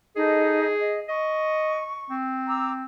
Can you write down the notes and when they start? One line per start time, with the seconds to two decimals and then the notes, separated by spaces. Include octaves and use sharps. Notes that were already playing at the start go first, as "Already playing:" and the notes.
0.16 D#4 G#4 A4 D#5
0.80 D#5
1.09 D#5 C#6
2.10 C4
2.47 A#5 D6 E6